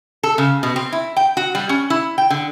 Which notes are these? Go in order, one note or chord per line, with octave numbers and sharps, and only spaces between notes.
A4
C#3
B2
C4
E4
G5
F#4
G3
C#4
E4
G5
D3